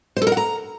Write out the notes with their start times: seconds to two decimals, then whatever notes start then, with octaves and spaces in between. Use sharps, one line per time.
0.17 C5
0.22 A4
0.27 A#4
0.32 F#5
0.37 A#5